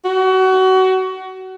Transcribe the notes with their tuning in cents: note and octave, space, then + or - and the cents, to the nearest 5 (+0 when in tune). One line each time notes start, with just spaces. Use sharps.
F#4 +25